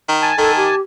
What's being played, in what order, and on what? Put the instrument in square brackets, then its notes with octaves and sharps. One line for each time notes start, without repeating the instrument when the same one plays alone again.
[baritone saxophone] D#3
[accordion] G#5 A5
[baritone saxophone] D#3 [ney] A4
[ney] G4